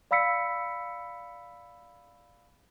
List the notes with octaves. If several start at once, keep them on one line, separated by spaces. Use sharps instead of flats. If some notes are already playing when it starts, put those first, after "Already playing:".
D5 F5 B5 E6 B6 C#7